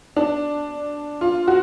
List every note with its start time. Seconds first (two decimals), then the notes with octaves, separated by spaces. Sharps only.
0.16 D4
1.21 F4
1.47 F#4